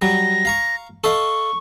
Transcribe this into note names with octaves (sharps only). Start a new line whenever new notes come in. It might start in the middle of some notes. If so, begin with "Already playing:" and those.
F#3 G3 A#6
F5 A#5 C#6
A4 D#5 F5 C#6